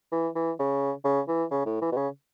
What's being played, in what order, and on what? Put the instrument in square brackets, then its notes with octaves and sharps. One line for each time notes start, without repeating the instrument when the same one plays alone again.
[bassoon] E3
E3
C#3
C#3
E3
C#3
A2
E3
B2
C#3